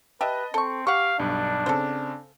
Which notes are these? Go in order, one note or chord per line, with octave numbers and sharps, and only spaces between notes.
G4 B4 D#5 E5 A5
C4 A4 C#6 C#7
G4 F5 F#5 C#6
B1 G2 D4
C#3 C4 A4 C5